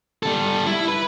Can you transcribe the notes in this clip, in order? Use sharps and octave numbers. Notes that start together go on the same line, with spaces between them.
G3 A4
E4
B4